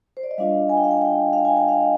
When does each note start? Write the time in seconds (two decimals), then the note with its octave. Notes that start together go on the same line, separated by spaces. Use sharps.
0.17 C5
0.23 D5
0.31 D#5
0.38 G3 D4 F4 F5
0.69 G#5
0.77 G5
0.84 F5
0.91 G5
1.02 G5
1.33 F5
1.45 G#5
1.57 G5
1.68 F5
1.81 D#5